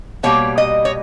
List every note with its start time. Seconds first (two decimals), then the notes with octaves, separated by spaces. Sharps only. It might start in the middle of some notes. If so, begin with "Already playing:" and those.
0.23 B2 G3 A#3 C#5
0.58 D#5
0.85 C#5